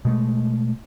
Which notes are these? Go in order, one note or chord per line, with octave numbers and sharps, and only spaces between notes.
B2 G#3 A3